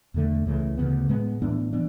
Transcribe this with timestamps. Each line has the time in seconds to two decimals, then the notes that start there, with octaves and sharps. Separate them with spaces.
0.14 E2 D3 A3
0.46 C#2 C#3 E3 A3
0.77 D2 C#3 E3 B3
1.09 A2 G#3 B3
1.42 A2 E3 B3 D4
1.73 E3 B3 D4